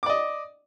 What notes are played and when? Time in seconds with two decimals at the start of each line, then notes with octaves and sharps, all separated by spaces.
0.03 D6
0.06 D5
0.10 D#5